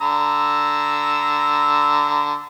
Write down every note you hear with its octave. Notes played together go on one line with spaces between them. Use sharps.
D3 A#5 E6